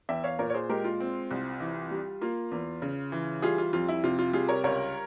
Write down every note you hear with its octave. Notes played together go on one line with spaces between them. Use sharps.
E2 E5 G5
C#5 F5
A#2 A#4 C#5
C#5
G#4 C5
G#3 G4 A#4
F4
C4
C2
E3
G3
A#3 F4
E2
C#3
E3
G3 F4 G#4
F4
F2 F4
E4
C3 F4
F4
G3 F4 G#4
A#4 C#5
C#2 A#4 C#5